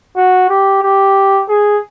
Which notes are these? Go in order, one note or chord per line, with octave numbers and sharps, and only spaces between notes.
F#4
G4
G4
G#4